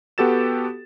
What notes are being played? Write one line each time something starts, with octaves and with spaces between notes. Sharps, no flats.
B3 F#4 G4 A4 A6 E7